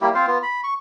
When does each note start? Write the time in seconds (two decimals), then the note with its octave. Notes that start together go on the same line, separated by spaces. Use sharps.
0.01 G3 A#3 E4 G4
0.15 C4 F4 C5 F5
0.27 B3 F4
0.43 B5
0.64 C#6